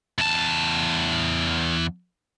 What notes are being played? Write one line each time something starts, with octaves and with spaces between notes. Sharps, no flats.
E2 A5